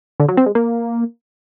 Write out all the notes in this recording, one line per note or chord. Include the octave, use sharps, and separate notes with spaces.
D3
F#3
C4
G#3
A#3